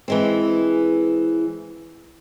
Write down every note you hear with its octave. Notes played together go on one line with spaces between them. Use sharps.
E3 G#3 C4